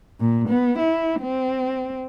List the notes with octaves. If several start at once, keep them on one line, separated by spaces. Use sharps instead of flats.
A#2
B3
E4
C4